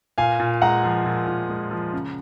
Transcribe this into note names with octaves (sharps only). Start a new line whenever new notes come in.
A#2 F5 G#5
A#2
G#3 F#5 A#5
F3
A#2
A#2
G#3
F3
C#3